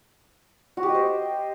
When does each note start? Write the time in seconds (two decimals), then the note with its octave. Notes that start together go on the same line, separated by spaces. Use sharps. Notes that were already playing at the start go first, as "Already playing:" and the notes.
0.77 F#4
0.83 G4
0.89 D#5
0.95 C5